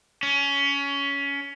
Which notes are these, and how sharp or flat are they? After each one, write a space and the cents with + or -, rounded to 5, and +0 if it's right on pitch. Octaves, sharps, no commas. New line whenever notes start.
C#4 +20